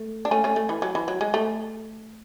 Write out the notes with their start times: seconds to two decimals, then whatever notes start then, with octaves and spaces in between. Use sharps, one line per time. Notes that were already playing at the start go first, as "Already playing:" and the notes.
Already playing: A3
0.25 D4
0.31 A3 C#4
0.44 A3 C#4
0.56 A3
0.69 E3
0.82 F#3
0.95 E3
1.08 F#3
1.21 G#3
1.34 A3